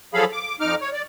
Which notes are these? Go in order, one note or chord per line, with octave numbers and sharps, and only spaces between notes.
F3 F#3 G#4 A4 F5 B5
D6
F2 D#4 D6 F6
C#5
D5